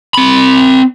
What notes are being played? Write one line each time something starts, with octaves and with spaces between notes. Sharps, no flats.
C4 B5